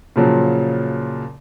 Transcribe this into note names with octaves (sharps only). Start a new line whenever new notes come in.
A#2 C#3 F3 F#3